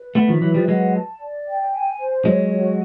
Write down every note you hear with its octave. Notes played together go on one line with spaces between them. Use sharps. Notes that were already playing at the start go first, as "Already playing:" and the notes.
Already playing: B4
A3 B3 E5
D#3 F3
E3 F#3 B4
F3 G3
F#3 G#3 F#5
A5
D5
G5
G#5
C5
F#3 G#3 C#5
F#4